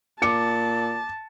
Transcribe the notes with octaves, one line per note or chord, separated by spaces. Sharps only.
A#2 A5 D6 C#7